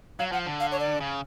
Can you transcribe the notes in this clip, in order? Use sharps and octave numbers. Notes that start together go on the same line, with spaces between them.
F#3 F5
F3 F#5
D3
F5
C#5
D5
C#3